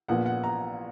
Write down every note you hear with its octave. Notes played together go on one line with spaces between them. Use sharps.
A#1 A#2 F3 B3 F#5
F#5
A#5